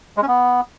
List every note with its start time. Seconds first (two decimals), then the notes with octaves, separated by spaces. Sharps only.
0.17 G#3
0.22 C#4
0.28 B3